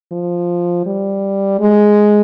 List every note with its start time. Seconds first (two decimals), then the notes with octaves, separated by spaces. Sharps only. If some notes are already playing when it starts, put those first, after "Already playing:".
0.12 F3
0.86 G3
1.60 G#3